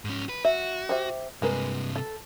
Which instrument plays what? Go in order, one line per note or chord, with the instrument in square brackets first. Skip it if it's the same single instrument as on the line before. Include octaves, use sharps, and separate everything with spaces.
[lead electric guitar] G#2 C#4
B4
[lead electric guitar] F#4 [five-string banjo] E5
[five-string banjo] G4 C5 E5
[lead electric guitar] G2 C3 [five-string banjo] G#3 A#4 B4
[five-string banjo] A4